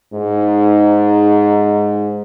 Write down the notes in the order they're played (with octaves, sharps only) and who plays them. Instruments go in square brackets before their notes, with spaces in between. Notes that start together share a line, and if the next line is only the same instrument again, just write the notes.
[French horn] G#2 [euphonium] D#4